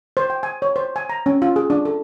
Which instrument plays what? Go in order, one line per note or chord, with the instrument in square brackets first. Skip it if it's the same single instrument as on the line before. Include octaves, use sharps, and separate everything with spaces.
[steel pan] C5
G5
G#5
C#5
C5
G#5
A#5
C#4
F4
G#4
D4
A4